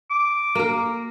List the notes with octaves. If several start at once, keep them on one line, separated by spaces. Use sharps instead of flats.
D6
A#3 A#4